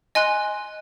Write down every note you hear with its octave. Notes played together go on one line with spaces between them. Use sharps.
D#5 G#5 C6 F#6